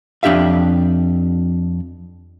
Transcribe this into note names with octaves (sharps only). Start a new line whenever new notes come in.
F2 D4 G4 E5 F5